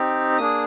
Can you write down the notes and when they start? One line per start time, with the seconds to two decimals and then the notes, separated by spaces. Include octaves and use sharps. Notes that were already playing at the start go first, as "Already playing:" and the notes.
Already playing: C4 D#4 G4
0.38 A#3 D4 G#4 D#6